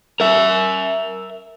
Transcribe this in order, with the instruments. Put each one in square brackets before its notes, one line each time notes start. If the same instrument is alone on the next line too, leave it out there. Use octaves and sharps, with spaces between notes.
[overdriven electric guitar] A#4 E5